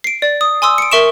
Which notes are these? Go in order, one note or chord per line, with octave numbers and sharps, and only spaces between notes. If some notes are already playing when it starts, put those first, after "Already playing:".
C7 D7
D5
D#6
G#5 C6 D#6 E6
C#7 D7
A#4 E5 C#6 D7 E7